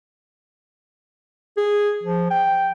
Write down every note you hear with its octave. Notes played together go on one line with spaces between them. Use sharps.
G#4
F3
G5